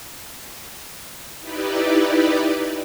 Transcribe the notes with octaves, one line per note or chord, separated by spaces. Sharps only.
D#4 E4 G4 B4 D5